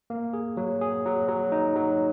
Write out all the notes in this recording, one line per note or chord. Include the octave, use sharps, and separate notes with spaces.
A#3
G#4
F#3
G#4
F#3
F#3
D#4
F#3